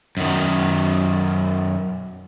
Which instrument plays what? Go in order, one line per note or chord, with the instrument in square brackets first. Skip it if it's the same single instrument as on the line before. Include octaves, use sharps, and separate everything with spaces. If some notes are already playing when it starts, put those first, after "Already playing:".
[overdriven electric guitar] F#2 D#3